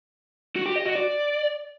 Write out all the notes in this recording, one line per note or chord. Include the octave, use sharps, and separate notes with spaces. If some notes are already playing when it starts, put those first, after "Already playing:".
F#4
G4
D#5
F#4
D5